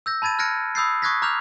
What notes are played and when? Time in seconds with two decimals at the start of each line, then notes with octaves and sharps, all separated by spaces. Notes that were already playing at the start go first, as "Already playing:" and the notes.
0.06 E6 G6 A#6
0.22 A5 B5 G#6 A6 D#7
0.39 F6 F#6 G#6 A#6 C#7 D7
0.75 B5 D#6 E6 G6 A6 C7
1.02 C#6 D#6 F#6 G#6 A#6 B6
1.22 A#5 D6 F6 G6 F7